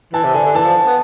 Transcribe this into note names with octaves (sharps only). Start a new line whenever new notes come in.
E3 A5
C3
D3 G#5
D3
E3 A5
F3
B3